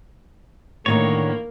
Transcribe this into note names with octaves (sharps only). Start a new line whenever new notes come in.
A2 D3 D#3 A#3 D#4 C#5